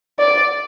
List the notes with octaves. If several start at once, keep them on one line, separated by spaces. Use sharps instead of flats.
D5